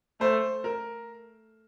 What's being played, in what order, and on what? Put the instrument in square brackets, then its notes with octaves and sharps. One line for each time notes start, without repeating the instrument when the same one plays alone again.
[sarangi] A3 [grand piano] C5
[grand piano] A#4